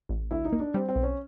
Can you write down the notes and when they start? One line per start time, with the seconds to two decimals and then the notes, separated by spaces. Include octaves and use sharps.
0.09 A1
0.31 D2 E4
0.45 D#4
0.52 A#3
0.60 D4
0.74 G3 C4
0.89 C4
0.96 B1
1.03 C#4